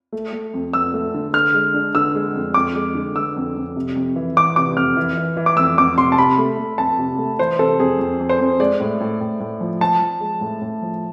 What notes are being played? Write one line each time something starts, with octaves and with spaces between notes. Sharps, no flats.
A3
A3
F2
F2 E6
A3
D3
D3 F6
G#3
D4
D3 E6
G#3
F2
F2 D6
G#3
D3
D3 E6
F2
F2
C3
F2
E3
E3 D6
C3 D6
F2 F6
E3
E3
E3
D6
F2 E6
F2 D6
C3 C6
A5
C3 B5
A3
A3
F2 A5
C3
A3
E3 C5
C3 A4
F2 G#4
F2
F2
C5
F2
G#3 D5
A2
A2
A2
A2
F3
F3 A5
F3
G#3
A2
A2
F3